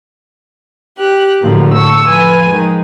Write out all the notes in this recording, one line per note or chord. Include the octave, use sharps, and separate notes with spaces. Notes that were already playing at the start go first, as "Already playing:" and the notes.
G4 F#6
A2 D3 F3 F#3 A#3
A4 C#6 E6
F2 F4 B4 G#5
D#3 F3 G#3